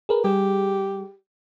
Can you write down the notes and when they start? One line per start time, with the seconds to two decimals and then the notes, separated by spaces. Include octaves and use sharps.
0.09 G#4 A#4 B4
0.24 G3 G4 G#4